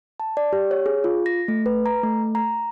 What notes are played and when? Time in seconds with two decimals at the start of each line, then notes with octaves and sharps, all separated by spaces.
0.20 A5
0.37 D5
0.53 G4
0.71 C#5
0.86 G#4
1.04 F4
1.26 A#6
1.48 A3
1.66 B4
1.86 A#5
2.03 A3
2.35 A#5